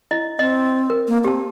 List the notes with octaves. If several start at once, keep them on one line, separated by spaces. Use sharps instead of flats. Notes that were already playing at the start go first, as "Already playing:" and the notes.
E4 D#5
C4 D#5
A#4
A#3
C4 G4 A5